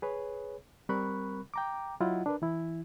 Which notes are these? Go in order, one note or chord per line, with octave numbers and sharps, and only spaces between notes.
G#4 B4 C#5
G3 C4 A#4 B5 C#6 F#6
G5 A#5 D6
F#3 E4 F4 D#5 F#5
D4 A#4 B4
E3 E4